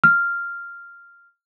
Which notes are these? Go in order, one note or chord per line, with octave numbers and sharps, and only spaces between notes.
F6